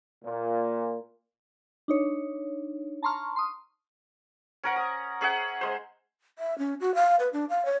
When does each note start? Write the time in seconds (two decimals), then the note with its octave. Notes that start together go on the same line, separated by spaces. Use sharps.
0.25 A#2
1.88 D4 D#4 C#5
3.03 A5 A#5 C6 C#6 F6
3.36 C6 D#6
4.64 C#4 A#4 F#5
4.76 D#6
5.21 C#4 G#4 E5 F#5
5.61 G#3 C5
6.39 E5
6.58 C#4
6.80 F#4
6.95 F5
7.19 B4
7.33 D4
7.49 F5
7.65 C#5